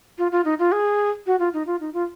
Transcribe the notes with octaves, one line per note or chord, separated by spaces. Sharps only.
F4
F4
D#4
F4
G#4
F#4
F4
D#4
F4
D#4
F4